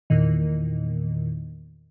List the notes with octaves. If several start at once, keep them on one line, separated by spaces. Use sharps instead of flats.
E2 A#2 D#3